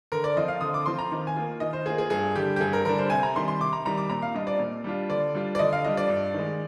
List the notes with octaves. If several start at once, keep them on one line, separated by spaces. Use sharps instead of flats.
D3 A#4
D5
F3 C4 F4 D#5
F5
D3 D#6
D6
F3 C4 F4 C6
A#5
D#3
G#5
A#3 F4
D#3 D#5
C5
A#3 F4 G#4
G#4
G2 G#4
D3 G3 D4 G4
G4
G2 G#4
A#4
D3 G3 D4 A#4
C5
C3 G#5
A#5
D#3 G3 C6
C6
C3 D6
A#5
D#3 G3 A#5
D6
A#2 A#5
F5
G3 D4 F4 D#5
D5
A#2
G3 D4 F4
D3 D5
G3 D4 F4
D5
D3 D#5
F5
G3 D4 F4 D#5
D5
G2
D#3 G#3